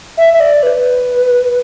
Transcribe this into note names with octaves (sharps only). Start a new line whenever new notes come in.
E5
E5
D5
B4